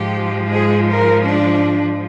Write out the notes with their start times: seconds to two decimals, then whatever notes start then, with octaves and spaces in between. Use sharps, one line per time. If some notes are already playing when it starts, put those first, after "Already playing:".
Already playing: G#2 F3 G#3 G4
0.52 G#4
0.89 A#4
1.27 D4